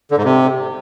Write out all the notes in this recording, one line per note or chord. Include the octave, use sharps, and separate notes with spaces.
D3
G#2
C3